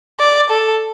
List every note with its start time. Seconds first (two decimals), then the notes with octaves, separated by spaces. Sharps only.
0.19 D5
0.50 A4